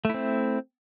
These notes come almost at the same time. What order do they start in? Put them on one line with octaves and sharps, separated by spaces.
A3 E4 C4